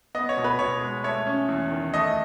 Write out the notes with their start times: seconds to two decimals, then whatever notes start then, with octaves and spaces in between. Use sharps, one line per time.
0.15 B3 D#5
0.29 C#5
0.37 B2
0.44 B4
0.59 B2 C#5
0.81 G#3
1.04 A3 C#5
1.27 C#4
1.49 E2
1.71 D#3
1.94 A3 D#5